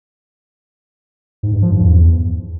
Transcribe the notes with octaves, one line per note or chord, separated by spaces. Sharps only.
G#2
G2
F3
G2
E2